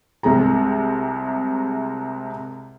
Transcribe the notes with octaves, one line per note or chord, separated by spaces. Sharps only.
C2 C3 G#3 G#4 A#5